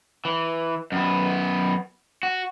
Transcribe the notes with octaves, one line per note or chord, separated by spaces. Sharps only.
E3
F#2 B3
F#4